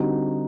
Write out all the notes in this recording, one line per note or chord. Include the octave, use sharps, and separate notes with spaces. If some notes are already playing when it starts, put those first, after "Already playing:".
Already playing: D3 G3 C4 D#4 F#4